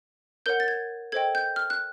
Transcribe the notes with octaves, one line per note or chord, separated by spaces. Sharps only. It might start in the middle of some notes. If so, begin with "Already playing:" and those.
A#4 C#5 F#5 G6
A6
G#6
A4 C5 D#5 G5 G#6
G6
F6
F#6